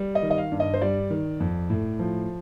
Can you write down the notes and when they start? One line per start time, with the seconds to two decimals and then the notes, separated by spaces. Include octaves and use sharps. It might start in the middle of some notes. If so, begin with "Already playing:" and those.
Already playing: G3
0.15 D#5
0.22 D#3
0.31 D#5
0.38 F5
0.52 G2
0.60 D#5
0.74 C5
0.81 G3 D5
1.10 D#3
1.40 F2
1.70 A2
1.99 F3